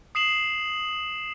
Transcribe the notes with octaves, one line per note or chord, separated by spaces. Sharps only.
D#6 C7 E7 F#7